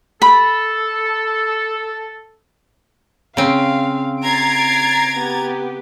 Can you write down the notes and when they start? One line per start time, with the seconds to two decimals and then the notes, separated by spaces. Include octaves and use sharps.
0.22 A4 B5
3.37 C#3 C4 F5
4.22 A#5 G#6 A6 C7 D7
5.17 B3 G4